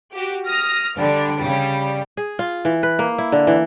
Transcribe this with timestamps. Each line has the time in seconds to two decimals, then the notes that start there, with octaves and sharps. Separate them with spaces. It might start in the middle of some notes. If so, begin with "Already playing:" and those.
0.12 F#4 G4
0.45 D#6 F6 A#6
0.96 D3 G3 D4
1.38 C#3 G3
2.17 G#4
2.39 F4
2.65 E3
2.83 B4
2.99 A#3
3.18 E4
3.32 D3
3.47 E3